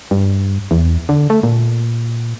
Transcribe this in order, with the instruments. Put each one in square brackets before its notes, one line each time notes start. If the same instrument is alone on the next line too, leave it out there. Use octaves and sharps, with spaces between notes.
[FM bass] G2
E2
D3
A3
A#2